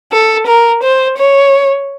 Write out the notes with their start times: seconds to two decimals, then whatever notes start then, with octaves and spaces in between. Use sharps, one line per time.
0.12 A4
0.47 A#4
0.83 C5
1.18 C#5